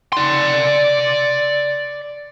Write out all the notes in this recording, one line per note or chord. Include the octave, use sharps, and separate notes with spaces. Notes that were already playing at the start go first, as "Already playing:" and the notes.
D5 C6